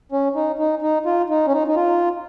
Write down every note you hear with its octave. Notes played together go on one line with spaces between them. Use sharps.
C#4
D#4
D#4
D#4
F4
D#4
C#4
D#4
D#4
F4